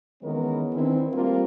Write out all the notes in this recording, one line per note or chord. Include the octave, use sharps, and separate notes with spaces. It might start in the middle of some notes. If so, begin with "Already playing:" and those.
D#3 E3 G#3 B3 C#4 A#4
D#3 E3 C4 D4 E4
G3 A3 A#3 C4 F4 A#4